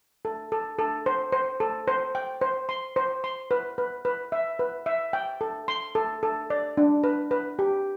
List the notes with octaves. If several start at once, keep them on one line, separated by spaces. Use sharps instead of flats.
A4
A4
A4
C5
C5
A4
C5
G5
C5
C6
C5
C6
B4
B4
B4
E5
B4
E5
G5
A4
C6
A4
A4
D5
D4
B4
B4
G4